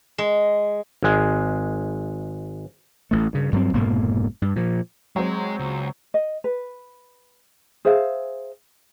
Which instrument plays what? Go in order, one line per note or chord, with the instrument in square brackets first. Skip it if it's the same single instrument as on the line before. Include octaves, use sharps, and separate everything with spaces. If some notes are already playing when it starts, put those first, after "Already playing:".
[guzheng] G#3
[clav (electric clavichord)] G#1 G#3
[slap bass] A1 A3
G2 C#3
G2 F#3 C4
F1 G#2 B2 A#3
G2
A#2 F3
[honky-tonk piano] F#3 C4 [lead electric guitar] G#3
[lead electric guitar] C#2
[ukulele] D#5
B4
G#4 C5 E5 F5